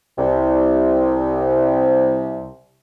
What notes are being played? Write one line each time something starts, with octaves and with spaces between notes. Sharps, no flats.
C2 C3